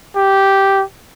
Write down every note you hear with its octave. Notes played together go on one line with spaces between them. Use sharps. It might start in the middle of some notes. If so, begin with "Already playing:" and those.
G4